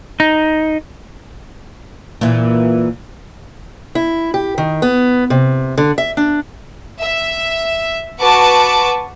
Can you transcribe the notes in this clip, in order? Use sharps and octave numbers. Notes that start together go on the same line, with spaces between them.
D#4
A#2 E3
E4
G4
D#3
B3
C3
D3
E5
D4
E5
F#4 B4 A5 C#6 D6